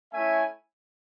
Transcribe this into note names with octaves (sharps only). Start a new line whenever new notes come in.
A3 C#4 E4 E5 G#5